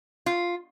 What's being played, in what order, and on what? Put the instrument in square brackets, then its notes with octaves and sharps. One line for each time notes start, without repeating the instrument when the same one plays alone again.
[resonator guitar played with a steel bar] F4